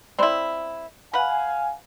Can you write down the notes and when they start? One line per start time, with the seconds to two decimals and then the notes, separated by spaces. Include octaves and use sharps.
0.19 C4 E4 D5 B5 C6
1.13 B4 F5 F#5 G#5